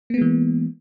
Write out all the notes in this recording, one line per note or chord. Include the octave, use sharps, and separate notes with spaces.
E3 G#3 A#3 B3